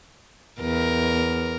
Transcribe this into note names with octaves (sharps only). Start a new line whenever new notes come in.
E2 A#4